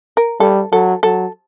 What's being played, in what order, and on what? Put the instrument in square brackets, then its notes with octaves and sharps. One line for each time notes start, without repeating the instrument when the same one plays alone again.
[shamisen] A#4
[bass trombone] G3 [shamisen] A4
[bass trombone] F#3 [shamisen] A4
[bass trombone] F#3 [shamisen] A4